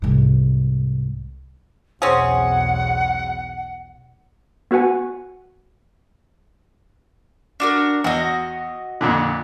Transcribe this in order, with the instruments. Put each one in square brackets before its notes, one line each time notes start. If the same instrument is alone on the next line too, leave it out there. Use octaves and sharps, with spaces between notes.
[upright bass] C2 G#2
[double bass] B1 E2 [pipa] C4 C#4 G#4 [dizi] F#5
[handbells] B3 F#4 B4 F#5 G#5
[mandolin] D4 F#4 A#4
[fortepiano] E2 [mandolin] F#4 D#5
[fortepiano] F2 A#2 D3